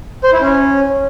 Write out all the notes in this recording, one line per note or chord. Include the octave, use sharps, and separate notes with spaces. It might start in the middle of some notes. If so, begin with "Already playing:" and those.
C5
E4
C#4